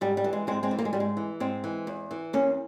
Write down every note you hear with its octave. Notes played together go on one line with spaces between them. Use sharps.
G#2 G3
G3
E3
G#3
G#2 G#3 C4
G#3 C4
E3
A#3
G#3
G#2 G3
G#3
E3
G#2 G#3 C4
E3
E2
E3
E2 A#3 C#4